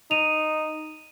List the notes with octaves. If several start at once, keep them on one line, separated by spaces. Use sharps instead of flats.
D#4 D#7 F7